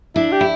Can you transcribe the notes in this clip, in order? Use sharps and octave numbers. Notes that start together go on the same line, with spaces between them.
D4 E4
G4
E4